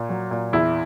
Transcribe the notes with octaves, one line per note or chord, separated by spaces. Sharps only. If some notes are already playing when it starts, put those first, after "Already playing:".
Already playing: A#2
F#3
A#2
E2 E4